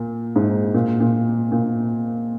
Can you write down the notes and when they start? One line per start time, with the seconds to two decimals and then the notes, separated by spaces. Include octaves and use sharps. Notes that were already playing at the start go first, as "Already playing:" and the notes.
Already playing: A#2
0.36 G#2
0.74 A#2
1.00 A#2
1.52 A#2